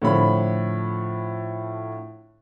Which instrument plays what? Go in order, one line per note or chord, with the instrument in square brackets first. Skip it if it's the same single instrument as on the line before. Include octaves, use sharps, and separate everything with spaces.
[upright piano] A2 D3 F3 C#5 B5